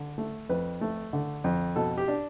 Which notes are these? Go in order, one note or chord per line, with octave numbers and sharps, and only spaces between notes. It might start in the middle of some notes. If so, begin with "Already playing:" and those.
Already playing: D3
A3
F2 B4
A3
D3
F2
B2 A4
G4
D4